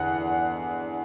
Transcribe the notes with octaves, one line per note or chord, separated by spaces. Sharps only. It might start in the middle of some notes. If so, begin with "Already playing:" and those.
Already playing: E2 D3 F#5